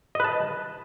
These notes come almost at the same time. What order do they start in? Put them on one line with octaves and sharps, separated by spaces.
D#5 B4 A5